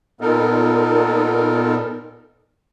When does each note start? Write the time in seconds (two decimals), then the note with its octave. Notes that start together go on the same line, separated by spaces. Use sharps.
0.21 A#2 B3 D#4 A4 A#4